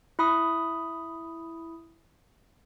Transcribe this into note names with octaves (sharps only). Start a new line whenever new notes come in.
E4 B5 D#6